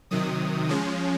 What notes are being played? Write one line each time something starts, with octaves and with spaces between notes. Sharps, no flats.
C3 D#3 F#3 D#6
F3 G#3 C#4